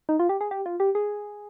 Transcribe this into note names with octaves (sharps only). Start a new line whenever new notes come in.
D#4
F4
G4
G#4
G4
F4
G4
G#4